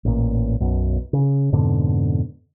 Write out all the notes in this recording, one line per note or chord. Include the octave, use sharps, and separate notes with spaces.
A1 A#2
B1 F#2 B2
C#3
F2 G#2 B2 D3